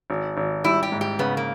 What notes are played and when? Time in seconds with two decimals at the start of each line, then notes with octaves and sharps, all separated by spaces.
0.10 G#1
0.37 G#1
0.64 G3 E4
0.83 G4
0.92 G#2
1.01 G4
1.19 C#3 B3
1.37 A#3